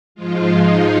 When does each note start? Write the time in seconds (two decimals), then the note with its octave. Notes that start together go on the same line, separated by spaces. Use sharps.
0.15 G#2 F3 G#3 F4
0.55 D#4